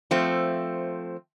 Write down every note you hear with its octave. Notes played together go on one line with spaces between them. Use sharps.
F3 A3 C4